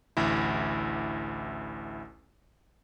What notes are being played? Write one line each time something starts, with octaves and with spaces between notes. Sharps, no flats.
A1 D2 E4